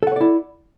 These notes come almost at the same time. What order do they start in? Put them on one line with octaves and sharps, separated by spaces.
A4 F#5 C#5 D5 E4